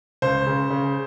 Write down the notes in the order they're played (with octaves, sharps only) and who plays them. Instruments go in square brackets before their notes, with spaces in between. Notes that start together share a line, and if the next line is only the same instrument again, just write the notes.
[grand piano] C#2 C5
C#3
C#3